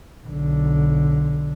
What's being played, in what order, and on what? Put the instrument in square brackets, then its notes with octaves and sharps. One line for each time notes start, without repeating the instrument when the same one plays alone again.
[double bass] B1 D3